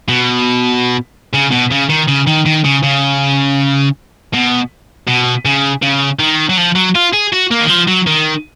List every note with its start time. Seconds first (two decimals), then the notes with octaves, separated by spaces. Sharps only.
0.09 B2
1.34 C#3
1.52 B2
1.72 C#3
1.90 D#3
2.08 C#3
2.27 D#3
2.46 D#3
2.65 C#3
2.83 C#3
4.34 B2
5.07 B2
5.45 C#3
5.83 C#3
6.19 D#3
6.50 F#3
6.58 F3
6.75 F#3
6.95 F4
7.13 G#4
7.33 F#4
7.51 A#3
7.60 D#3
7.69 F3
7.88 F#3
8.07 D#3